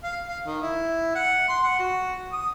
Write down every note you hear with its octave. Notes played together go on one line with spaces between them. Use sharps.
F5
F5
D#3
E4
F#5
C6
F#5
F#4
D#6